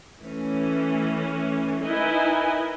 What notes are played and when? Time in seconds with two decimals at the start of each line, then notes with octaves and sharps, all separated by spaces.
0.21 E3 A3 C#4
1.83 D#4 E4 A#4 B4 D#5 G#5